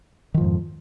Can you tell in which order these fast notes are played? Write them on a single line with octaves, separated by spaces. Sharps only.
D#3 F3 G#2 F2